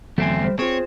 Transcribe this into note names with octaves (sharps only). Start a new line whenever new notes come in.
E2 D3 F#3 A3 C4 G#5
G3 C5
C4 F4 G#4 C5 C#5